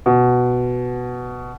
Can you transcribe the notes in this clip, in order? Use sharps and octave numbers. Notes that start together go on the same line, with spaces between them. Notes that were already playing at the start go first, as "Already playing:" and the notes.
B2